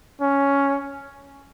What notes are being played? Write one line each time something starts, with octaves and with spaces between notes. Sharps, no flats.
C#4